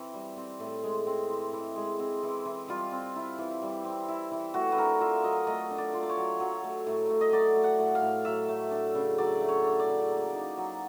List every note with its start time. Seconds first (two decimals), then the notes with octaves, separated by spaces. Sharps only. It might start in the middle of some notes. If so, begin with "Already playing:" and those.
Already playing: E3 C4
0.14 G3
0.37 C4
0.60 A2
0.84 G#3
1.06 C4
1.29 E3
1.53 E3
1.76 G#3
1.99 C4
2.23 E3
2.45 E3
2.68 G3 F4
2.92 C4
3.16 E4
3.38 E3
3.62 G3
3.85 C4
4.08 E4
4.32 E3
4.54 A3 F#4
4.72 B4
4.77 D4 A#4
5.00 F4 E5
5.24 F#3 D#5
5.47 A3 D#5
5.71 D4
5.78 D5
5.94 F4
6.03 D5
6.09 C#5
6.17 F#3
6.40 F#3
6.64 A3
6.87 A2
7.10 A2
7.21 D#5
7.32 F#3 D5
7.56 A3
7.64 F#5
7.79 A2
7.95 F5
8.02 A2
8.25 F#3 E5
8.48 A3
8.71 D4
8.95 C#3
9.18 F#3 D5
9.41 A3
9.48 C#5
9.64 D4
9.79 D5
9.87 C#3
10.10 A#3
10.34 D#4
10.57 F#3